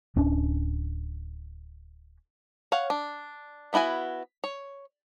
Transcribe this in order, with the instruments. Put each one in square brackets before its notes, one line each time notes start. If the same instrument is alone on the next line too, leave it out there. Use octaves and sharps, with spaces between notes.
[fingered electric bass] D1 C#4 D4
[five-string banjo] C#5 F5 F#5
D4
A3 B3 E4 F#4 G#5
C#5